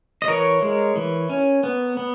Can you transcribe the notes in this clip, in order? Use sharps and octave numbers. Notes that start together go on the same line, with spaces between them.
D#5
E3 A#4 C#5
G#3
E3
C#4
B3
B3